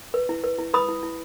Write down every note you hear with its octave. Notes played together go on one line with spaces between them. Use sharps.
B4
E4
B4
E4
B4 B5 D#6
E4
E4